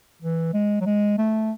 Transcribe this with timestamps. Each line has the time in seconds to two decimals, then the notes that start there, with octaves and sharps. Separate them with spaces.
0.22 E3
0.54 G#3
0.81 F#3
0.86 G#3
1.18 A3